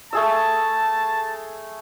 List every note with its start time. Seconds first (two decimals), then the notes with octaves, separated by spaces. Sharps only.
0.13 A3 G#4 A5 E6